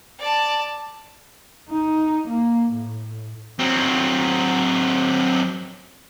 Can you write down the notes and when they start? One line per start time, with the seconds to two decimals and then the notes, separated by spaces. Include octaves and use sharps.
0.20 D5 A5
1.70 D#4
2.29 A#3
2.73 A2
3.59 F#3 C4